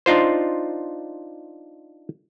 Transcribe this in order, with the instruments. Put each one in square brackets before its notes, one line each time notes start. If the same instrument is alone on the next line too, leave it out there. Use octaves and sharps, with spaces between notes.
[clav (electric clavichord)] D4 D#4 F4 C5